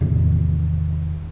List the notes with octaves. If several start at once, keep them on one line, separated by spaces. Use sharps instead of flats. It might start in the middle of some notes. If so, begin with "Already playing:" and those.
E2 A2 C3 D#3